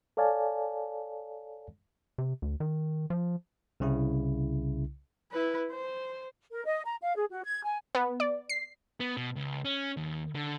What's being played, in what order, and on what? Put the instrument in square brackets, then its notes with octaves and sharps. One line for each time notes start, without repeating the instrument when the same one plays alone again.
[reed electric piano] A4 C#5 D5 F5 G#5 A5
[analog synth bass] C3
D2
D#3
F3
[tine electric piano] C2 C#3 E4
[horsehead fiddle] E4 B4
C5
[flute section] A#4
D#5
A#5
F5
G#4
F#4
G#6
G#5
[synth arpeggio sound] B3
D5
C7
[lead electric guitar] B3
B2
C#2
C#4
D#2
D3